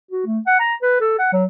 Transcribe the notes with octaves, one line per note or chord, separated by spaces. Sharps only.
F#4
A3
F#5
A#5
B4
A4
F#5
F#3